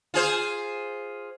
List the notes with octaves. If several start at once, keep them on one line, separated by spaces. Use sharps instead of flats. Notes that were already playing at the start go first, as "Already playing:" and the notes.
F4 G#4 C5